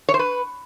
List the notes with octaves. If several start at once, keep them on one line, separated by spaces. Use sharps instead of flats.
C#5
C5
B4